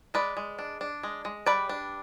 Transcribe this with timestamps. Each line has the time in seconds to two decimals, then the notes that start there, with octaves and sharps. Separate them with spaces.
0.14 G#3 B4 D5
0.37 G#3
0.59 D4
0.81 D4
1.03 G#3
1.25 G#3
1.46 G3 B4 D5
1.69 D4